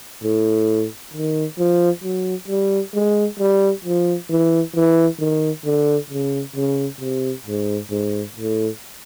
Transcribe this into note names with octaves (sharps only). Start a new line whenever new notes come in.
A2
D#3
F3
F#3
G3
G#3
G3
F3
E3
E3
D#3
D3
C#3
C#3
C3
G#2
G#2
A2